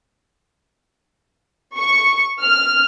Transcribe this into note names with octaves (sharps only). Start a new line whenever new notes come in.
C#6
F6